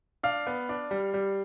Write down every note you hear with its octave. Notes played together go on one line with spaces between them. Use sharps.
D4 F5
B3
D4
G3
G3